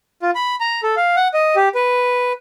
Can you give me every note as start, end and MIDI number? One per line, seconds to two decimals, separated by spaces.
0.22 0.31 65
0.35 0.55 83
0.60 0.81 82
0.83 0.95 69
0.97 1.16 77
1.16 1.28 78
1.34 1.55 75
1.56 1.69 67
1.75 2.33 71